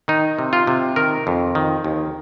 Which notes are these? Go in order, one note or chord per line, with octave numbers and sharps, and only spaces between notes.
D#3 D#4
C3
F4
C3
D#3 A#4
F2
D#3
D#2